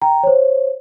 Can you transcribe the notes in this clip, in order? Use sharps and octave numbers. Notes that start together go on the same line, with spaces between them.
G5 A#5
C5 C#5